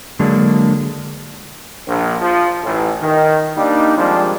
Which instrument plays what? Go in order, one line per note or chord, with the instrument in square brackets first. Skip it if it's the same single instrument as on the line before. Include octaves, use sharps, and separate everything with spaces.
[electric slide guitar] D3 F#3 G#3 A#3 D4
[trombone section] A#1
F3
A1
D#3
G3 A#3 D4 D#4
D#3 F3 G3 G#3 C4 D4